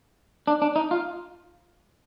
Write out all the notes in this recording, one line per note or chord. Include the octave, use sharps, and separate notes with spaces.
D4
D4
D#4
F4